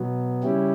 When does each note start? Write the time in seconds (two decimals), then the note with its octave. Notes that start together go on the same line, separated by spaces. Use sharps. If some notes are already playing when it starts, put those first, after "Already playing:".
Already playing: B2 F#3 B3
0.43 C#3 G3 C#4 E4 G4